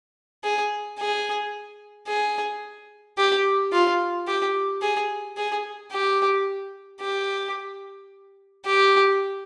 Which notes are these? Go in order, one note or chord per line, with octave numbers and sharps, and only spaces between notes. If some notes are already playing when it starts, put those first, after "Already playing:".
G#4
G#4
G#4
G4
F4
G4
G#4
G#4
G4
G4
G4